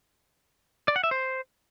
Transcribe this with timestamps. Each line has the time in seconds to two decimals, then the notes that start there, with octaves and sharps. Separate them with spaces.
0.88 D5
0.96 F#5
1.04 E5
1.11 C5